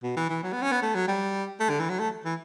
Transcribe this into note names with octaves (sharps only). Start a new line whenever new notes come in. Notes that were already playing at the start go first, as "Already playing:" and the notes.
B2
E3
E3
F#3
B3
C#4
B3
A3
F#3
G3
A3
D3
E3
F#3
A3
E3